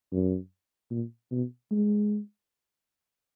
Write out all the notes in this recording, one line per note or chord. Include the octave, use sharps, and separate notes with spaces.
F#2
A#2
B2
G#3